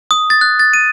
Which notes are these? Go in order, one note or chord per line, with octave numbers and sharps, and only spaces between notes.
D#6
A6
F#6
A6
D#7